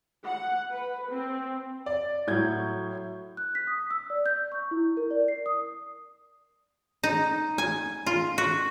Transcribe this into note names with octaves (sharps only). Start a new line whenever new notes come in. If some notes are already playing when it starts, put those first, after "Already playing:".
F#5
B4
C4
D5
A2 F#3 C#5 G6 G#6
F#6
B6
D#6
E6
D5
G6
C#6
E4
A#4
D5
C7
D#6
D#4
G#5
F4
F#4